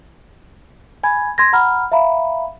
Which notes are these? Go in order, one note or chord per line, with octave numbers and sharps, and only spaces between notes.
G#5 B5 G#6
C6 G#6 A#6
F#5 A#5 B5 F6
E5 F5 A#5 B5